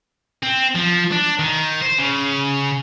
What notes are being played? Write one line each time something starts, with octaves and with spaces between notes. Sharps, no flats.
C4
F3
D4
D#3
C5
C#3